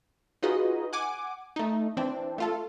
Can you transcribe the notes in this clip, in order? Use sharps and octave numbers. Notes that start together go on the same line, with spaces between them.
D#4 F4 F#4 G#4 B4 D#5
F#5 G#5 D6
A3 D#4
E3 C4 D4
A3 F4 A4